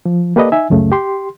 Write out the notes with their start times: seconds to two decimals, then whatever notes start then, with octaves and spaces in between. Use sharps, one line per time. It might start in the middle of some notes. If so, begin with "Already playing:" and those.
0.06 F3
0.36 A#3 G4 A4 B4 D5 D#5
0.52 D#4 E5 G#5
0.70 C#2 F#2 C#3 A3
0.92 G4 C6